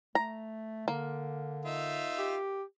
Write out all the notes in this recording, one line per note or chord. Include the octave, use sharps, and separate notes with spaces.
A3 A#5
D3 A#3
D#4 F4 E5
G4